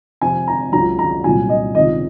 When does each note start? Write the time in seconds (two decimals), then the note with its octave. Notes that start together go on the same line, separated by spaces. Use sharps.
0.21 F2 C3 F3 G#5
0.48 A#5
0.72 C#2 C#3 F#3 A#5
0.99 A#5
1.24 C2 A#2 F#3 G#5
1.49 D#5
1.75 C#2 C3 D#3 D#5